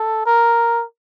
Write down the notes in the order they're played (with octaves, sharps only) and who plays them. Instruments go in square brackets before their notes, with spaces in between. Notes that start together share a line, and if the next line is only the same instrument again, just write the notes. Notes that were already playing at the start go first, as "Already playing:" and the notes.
Already playing: [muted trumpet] A4
A#4